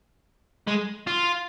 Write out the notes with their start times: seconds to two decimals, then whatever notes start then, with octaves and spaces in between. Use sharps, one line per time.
0.67 G#3
1.07 F4